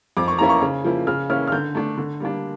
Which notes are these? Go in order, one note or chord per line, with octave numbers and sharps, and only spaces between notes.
F2 D6
C#6
E3 A#3 C#4 E4 A#5
C#6
C#3
F3 A#3 E4
C#3 F6
E3 A#3 C#4 E4 F6
F6
D3 G6
A3 D4
D3
G3 A#3 D4